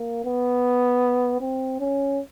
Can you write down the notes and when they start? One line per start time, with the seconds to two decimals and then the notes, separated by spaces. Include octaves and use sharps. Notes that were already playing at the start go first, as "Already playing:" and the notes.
Already playing: A#3
0.25 B3
1.41 C4
1.80 C#4